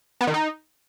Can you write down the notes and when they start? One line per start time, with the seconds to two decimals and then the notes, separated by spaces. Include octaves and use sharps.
0.21 B3
0.27 D#3
0.34 D#4